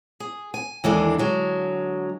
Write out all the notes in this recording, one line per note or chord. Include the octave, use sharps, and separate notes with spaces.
G#4
G#5
D#2 E3 G#3 D4 A4
D3 F#3 G#3